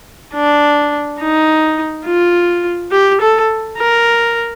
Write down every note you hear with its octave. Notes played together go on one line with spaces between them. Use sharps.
D4
D#4
F4
G4
A4
A#4